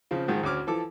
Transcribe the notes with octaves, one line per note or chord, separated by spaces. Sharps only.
C#3 F3 C4
G#2 D#3 F3 G#3
D2 C#4 F#4 D6 F6
E3 F3 A4 D6